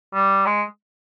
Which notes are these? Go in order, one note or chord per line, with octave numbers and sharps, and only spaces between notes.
G3
G#3